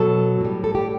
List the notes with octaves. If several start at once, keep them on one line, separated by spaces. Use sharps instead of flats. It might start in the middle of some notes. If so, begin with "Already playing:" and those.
Already playing: B2 F#3 A4
A2 G3
A4
G4